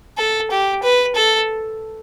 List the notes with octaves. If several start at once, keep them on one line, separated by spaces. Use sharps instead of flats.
A4
G4
B4
A4